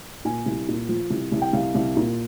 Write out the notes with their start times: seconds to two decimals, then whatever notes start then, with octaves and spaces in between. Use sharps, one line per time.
0.25 A#2 G#5
0.46 C2
0.69 A#2
0.89 F3
1.10 C2
1.32 C2
1.42 G5
1.53 C2 F5
1.75 C2
1.97 A#2